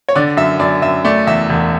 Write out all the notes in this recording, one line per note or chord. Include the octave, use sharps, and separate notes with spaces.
C#5
D3 D5
F#2 E5
F#2 D5
F#2 E5
A3 D5
E2 E5
E1